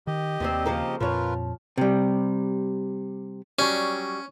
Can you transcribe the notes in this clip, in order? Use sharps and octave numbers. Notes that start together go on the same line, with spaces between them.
D#3 G4 D#5
D#2 C3 G3 C4
C#3 F3 A#3
F2 A#2 F3 F4 A#4 B4 C#5
C3 G3
F#3 G3 C#4